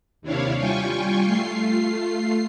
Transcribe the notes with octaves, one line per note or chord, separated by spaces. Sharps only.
D#2 C3 D4 E4 C#5 F5
G3 F4 G5 G#5 C#6
A3 F4 C7